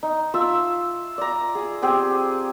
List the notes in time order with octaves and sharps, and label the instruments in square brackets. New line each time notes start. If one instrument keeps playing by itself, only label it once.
[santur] D#4
F4 E5 A5 E6
D5 A#5
G#4
C4 G4 G#4 G5